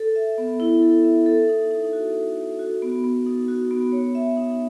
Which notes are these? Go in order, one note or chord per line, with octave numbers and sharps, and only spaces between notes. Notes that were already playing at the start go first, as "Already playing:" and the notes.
Already playing: A4
E5
B3
E4
A4
E5
A4
D#4
D#4
F#4
A4
D#4
F#4
B3
B3
D#4
F#4
B3
C#5
E5
D#4